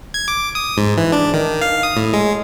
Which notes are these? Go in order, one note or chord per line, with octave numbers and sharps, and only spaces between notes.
G#6
D6
D#6
G#2
E3
D4
D#3
F5
D#6
A2
G#3